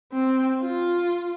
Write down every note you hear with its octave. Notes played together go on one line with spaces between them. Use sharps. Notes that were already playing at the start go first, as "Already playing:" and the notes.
C4
F4